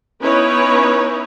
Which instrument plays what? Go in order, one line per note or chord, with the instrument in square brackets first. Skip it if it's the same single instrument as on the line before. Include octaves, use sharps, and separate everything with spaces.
[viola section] B3 C#4 D#4 E4 B4 C#5